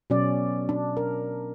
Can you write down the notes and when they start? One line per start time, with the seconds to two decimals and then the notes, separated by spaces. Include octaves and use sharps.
0.10 B2 F#3 C#4 D5
0.69 D4
0.97 A#4